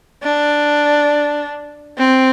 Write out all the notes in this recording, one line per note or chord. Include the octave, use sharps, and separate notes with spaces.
D4
C4